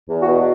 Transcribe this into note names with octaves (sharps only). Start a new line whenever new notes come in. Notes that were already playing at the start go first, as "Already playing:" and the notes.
E2
F#4
B2